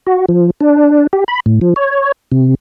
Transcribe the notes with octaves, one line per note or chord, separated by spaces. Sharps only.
F#4
F3
D4
G4
B5
A2
F3
C#5
C3